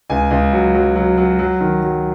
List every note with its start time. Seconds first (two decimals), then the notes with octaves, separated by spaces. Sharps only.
0.10 C#2 G#5
0.31 C#2
0.53 F#3
0.74 F#3
0.96 F#3
1.17 F#3
1.39 F#3
1.61 D#3
1.82 F#3